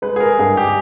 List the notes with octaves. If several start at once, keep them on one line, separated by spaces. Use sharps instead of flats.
G#3 B4
G#4
A#4
G2 G#4
G4